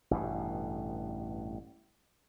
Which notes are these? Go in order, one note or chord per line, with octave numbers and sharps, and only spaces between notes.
A1 G2 B2